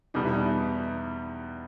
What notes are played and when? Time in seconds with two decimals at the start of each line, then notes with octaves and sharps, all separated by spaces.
0.14 E2 B2 G3 B3 D#4
0.25 E4
0.34 D#4